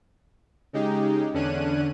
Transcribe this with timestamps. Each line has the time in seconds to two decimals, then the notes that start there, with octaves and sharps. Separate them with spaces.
0.73 C#3 G#3 D#4 G4
1.34 E2 D3 C#4 D4 F#6 D#7